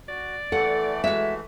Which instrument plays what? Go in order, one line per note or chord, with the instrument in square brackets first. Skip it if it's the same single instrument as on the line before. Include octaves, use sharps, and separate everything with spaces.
[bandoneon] F#4 [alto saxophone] D5
[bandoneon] E3 A3 [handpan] A4 [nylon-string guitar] F#5
[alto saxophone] G#3 [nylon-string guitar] F#4 E5